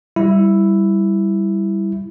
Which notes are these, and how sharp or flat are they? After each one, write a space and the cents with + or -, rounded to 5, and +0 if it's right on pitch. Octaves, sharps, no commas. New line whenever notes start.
G3 +0 E4 +0